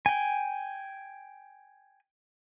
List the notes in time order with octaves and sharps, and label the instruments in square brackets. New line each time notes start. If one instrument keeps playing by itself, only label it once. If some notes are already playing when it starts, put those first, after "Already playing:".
[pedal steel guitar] G5 G#5